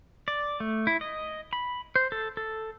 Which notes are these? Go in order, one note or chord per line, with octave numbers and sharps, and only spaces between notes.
D5
A3
E4
D#5
B5
C5
A4
A4